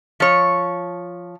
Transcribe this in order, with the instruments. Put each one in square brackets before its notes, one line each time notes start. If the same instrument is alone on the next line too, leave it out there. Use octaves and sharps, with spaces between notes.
[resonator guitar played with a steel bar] F3 C#5